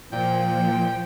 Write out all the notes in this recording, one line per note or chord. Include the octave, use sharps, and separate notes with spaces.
A#2 F3 G5